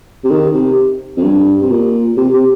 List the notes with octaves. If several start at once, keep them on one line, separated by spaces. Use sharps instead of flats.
C3
D#3
C3
F2
G2
C3
A#2
C3
C3